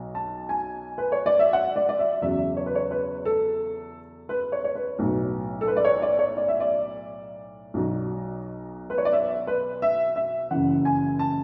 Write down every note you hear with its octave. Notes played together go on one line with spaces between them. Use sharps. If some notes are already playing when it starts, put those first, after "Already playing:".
Already playing: B1 B2 F#3
A5
G#5
B4
C#5
D5
E5
F#5
D5
D5
E5
E2 C#3 F#3 E5
C#5
B4
C#5
B4
A4
B4
C#5
C#5
B4
B1 A2 F#3
A4
B4
D5
C#5
D5
C#5
D5
E5
D5
B1 B2 F#3
B4
C#5
D5
E5
B4
E5
E5
F#1 F#2 E3 F#5
G#5
A5